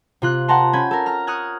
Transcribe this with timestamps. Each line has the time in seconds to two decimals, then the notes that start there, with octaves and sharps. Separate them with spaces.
0.22 C3 F4 F#6
0.48 A#4 F#5 G5 A5 A#5 C6
0.73 C#4 B5 G6 G#6
0.91 A4 A#4
1.06 A#5 F6
1.27 C#6 D#6 F6 F#6 G#6